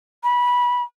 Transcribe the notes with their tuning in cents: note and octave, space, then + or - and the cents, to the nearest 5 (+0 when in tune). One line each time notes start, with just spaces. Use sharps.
B5 -20